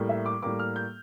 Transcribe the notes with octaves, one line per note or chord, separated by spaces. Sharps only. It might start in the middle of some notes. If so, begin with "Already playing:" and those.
Already playing: A2 G3 A#3
E5
D6
A2 G3 A#3 D6
F6
G6